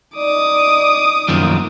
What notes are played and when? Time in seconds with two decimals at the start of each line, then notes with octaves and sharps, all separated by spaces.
0.16 D#4 D5 D6 D#6
1.28 F#2 D#3 F3 A#3